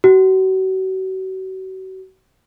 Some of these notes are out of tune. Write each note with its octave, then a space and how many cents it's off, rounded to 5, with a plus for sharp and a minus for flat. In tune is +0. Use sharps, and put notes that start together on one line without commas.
F#4 +35